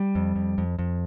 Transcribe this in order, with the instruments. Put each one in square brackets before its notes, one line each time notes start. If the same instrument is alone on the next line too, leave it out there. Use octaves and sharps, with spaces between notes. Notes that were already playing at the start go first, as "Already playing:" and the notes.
Already playing: [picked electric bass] G3
F2
F2
F2
F2